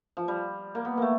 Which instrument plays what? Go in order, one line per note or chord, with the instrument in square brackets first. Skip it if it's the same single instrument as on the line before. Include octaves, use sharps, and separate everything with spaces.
[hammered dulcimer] F3
G3
A#3
B3
A3 A#3